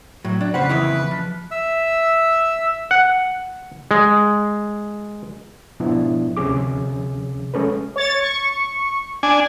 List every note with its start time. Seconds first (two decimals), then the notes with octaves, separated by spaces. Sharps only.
0.25 A2 F#3
0.41 D4
0.54 F2 A#2 C#3 B4 C5 F#5
0.69 E3 D#4 E4
1.11 F3
1.51 E5 E6
2.91 F#5
3.91 G#3
5.80 G#2 B2 F3 B3 D4 E4
6.37 D2 C3 F3 C#4 G#4 D6
7.54 G#3 C#4 A4 B4
7.96 C#5 A6
8.21 C#6
9.23 D4 G#5